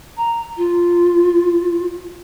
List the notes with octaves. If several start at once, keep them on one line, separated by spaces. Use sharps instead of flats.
A#5
F4